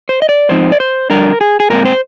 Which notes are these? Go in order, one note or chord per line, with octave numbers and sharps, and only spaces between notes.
C5
D#5
D5
G#2 F3 C4 D#4 C5
D5
C5
F2 D3 G3 D4 A#4
G#4
G#4
A#2 G#3 C4 A#4
C5